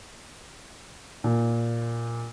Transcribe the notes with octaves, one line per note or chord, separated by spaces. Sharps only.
A#2